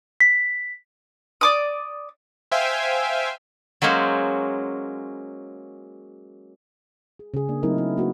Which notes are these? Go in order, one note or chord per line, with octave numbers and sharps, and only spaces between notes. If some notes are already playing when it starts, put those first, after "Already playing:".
B6
D5 D6 D#6
C5 E5 F5 G5 G#5
F#3 G#3 A#3 C#4 C5
G#4
C#3 G#4
A#3 D4
F#3 A3 C4 D#4 E4 A#4
E4
A#3 F#4 A#4 B4